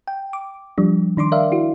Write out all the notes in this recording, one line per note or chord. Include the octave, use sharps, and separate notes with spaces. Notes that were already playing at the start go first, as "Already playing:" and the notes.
G5
D6
F3 G3 D4
D#3 D4 C6 D6
A#4 D5 E5 F5
E4 F#4